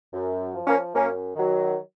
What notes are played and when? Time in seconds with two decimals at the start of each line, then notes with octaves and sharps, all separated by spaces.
0.13 F#2
0.54 F3
0.67 A#3 C#4
0.94 F#2 A#3 C#4
1.35 D#3 F#3